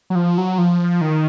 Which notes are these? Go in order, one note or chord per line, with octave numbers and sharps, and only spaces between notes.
F#3
F3
F#3
F3
D#3